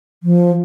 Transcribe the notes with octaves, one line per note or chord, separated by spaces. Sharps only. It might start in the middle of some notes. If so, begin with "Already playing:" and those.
F3